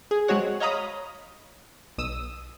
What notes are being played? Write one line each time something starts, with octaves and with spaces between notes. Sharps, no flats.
G#4
F#3 G#3 C4 F#4 C#5 F#5
C#5 D#5 F5 A#5 B5 D#6
B1 D#6 E6